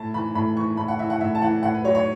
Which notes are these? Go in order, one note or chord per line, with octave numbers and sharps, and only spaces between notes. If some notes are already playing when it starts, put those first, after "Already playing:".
Already playing: A2 A5
E3 B5
A2 B5
E3 C#6
A2 B5
F#5
E3 E5
F#5
A2 E5
A5
E3 F#5
A2 F#5
B4
F#3 C#5
C#5